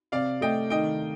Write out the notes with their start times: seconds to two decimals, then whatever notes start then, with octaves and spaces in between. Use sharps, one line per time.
0.12 C3 D5 F5
0.41 A3 D#5 G5
0.70 D#3 D#5 G5